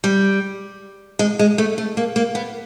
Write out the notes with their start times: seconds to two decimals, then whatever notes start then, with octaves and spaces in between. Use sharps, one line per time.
0.04 G3
1.19 G#3
1.39 G#3
1.58 A3
1.78 A3
1.97 A#3
2.16 A#3
2.35 B3